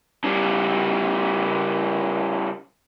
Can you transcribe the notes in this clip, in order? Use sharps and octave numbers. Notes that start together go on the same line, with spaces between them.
C#3 G3